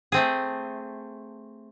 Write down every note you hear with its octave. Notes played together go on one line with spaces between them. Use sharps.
A3 C4 G#4